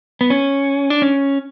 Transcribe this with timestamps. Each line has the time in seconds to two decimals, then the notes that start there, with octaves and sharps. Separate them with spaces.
0.21 B3
0.30 C#4
0.90 D4
1.02 C#4